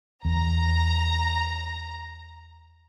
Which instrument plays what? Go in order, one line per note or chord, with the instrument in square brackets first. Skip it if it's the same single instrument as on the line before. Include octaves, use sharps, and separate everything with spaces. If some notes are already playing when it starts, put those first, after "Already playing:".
[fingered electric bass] E2 [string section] A#5